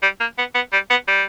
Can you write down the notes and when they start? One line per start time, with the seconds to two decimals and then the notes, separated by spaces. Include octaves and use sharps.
0.02 G3
0.20 A#3
0.38 B3
0.55 B3
0.73 G3
0.90 B3
1.08 G3